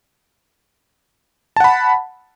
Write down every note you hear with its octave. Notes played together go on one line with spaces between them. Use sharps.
F#5 A5 B5